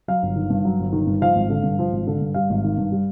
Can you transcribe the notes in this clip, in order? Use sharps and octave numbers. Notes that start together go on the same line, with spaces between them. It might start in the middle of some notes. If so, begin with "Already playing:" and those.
F#3 F5
G1
D#3
G2
F#3
G1
D#3
G2
F3 F5
G#1
D3
G2
F3
G#1
D3
G2
G3 F5
G#1
D#3
G2
G3